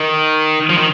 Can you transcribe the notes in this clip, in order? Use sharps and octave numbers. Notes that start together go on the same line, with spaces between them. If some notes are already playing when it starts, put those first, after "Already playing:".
Already playing: D#3
F3
D#3